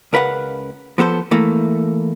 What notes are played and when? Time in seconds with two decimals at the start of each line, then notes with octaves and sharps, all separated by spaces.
0.13 C#2 A#4 B4 F5 F#5
0.98 F3 B3 A4 C5
1.31 E3 A3 A#3